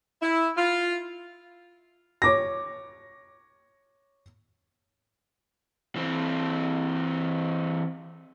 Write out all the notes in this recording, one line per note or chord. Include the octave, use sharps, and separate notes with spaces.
E4
F4
C#5 D6 A#6
E3 C4